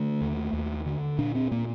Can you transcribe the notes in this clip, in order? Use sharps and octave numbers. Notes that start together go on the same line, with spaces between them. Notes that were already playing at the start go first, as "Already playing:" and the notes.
Already playing: D3 A3
D#2
D#2
D3
A#2 D4
C4
A#2 A#3